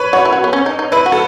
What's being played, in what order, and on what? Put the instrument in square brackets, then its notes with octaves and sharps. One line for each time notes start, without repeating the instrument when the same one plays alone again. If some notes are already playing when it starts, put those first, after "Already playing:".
Already playing: [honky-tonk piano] B4 C#5
[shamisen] F#4 [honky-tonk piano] C#5
[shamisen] E4
F#4
B3
C#4
D#4
D#4
[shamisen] E4 [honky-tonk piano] B4
[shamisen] F#4
[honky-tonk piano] A4